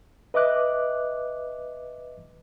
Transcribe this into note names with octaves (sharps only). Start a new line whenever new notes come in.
B4 D#5 E5 D6 F#6